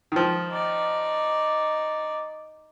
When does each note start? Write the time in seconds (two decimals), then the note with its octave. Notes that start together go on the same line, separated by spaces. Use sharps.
0.12 D#3 F3
0.50 D#4 D5